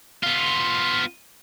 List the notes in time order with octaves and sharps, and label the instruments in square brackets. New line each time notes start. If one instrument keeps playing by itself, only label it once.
[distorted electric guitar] B3 F4